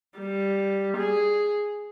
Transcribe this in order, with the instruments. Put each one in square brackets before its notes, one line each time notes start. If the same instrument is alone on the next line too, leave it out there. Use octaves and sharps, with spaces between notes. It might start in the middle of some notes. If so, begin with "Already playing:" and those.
[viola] G3
G#4